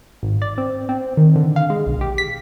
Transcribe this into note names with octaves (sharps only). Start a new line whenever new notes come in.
G#1
D5
C4
C4
D#3
D3
F5
G#3
B1
G4
B6